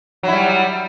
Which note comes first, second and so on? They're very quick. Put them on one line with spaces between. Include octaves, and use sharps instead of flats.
F#3 E4 G3